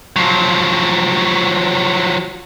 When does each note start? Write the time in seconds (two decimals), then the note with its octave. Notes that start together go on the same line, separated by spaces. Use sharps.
0.16 F3 F#3